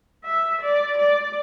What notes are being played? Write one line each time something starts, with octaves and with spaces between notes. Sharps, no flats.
E5
D5
D5